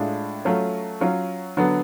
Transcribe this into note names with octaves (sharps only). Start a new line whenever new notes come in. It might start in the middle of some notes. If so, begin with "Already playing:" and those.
Already playing: A2 G#3 D4 F4
F#3 A3 C#4 F4
F#3 C#4 F4
D3 F#3 B3